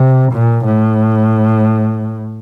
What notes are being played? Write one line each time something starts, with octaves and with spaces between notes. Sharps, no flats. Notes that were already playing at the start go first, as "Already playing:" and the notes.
Already playing: C3
A#2
A2